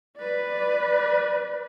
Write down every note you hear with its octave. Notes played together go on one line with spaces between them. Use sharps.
B4 D5